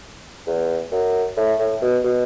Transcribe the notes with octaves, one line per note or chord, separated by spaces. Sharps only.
E2
F#2
A2
A2
B2
B2